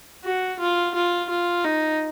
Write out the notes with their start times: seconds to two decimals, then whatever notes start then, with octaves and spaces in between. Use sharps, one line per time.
0.24 F#4
0.59 F4
0.94 F4
1.29 F4
1.64 D#4